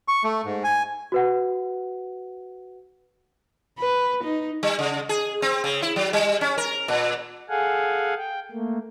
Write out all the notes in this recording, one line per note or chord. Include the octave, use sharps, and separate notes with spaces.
C#6
A3
G#2
G#5
F#4 B4 F#5
B4
D#4
G3
C#3
G#4
C4
C#3
E4
F#3
G3
C#4
A#4
A#2
G#4 A4 F5 F#5 G#5
G5
A3 A#3